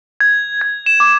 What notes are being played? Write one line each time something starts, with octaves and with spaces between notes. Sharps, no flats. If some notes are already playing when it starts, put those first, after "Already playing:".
G#6
G#6
E7
D6